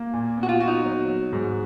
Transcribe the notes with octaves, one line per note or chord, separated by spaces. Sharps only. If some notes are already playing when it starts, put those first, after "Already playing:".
Already playing: A#3
A#2
B3
F#4
F4
F#4
D#4
F#3
F#3
G#2